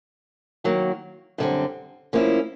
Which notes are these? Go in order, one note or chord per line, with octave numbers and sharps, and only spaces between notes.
D#3 F#3 A#3
F#2 D3 G3 C4
F3 A#3 C#4 E4